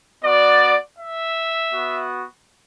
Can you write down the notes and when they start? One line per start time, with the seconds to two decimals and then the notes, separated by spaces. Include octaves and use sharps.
0.24 B3 F#4 D5
0.98 E5
1.73 B3 F#4